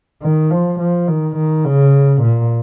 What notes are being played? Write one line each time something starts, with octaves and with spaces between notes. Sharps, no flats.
D#3
F3
F3
D#3
D#3
C#3
A#2